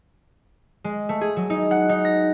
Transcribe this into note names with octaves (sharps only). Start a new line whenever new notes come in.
G#3
A3
G#4
F#3
D#4
F#5
D#4
A#6